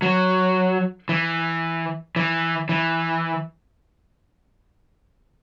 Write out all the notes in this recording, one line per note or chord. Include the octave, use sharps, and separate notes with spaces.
F#3
E3
E3
E3